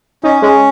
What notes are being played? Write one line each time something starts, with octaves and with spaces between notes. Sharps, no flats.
C#4 D#4
G#3 C#4